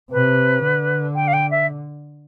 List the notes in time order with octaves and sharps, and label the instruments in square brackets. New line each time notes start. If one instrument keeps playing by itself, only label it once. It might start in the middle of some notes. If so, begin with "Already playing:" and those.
[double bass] C3 [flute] B4
[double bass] D3
[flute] G5
F5
G5
E5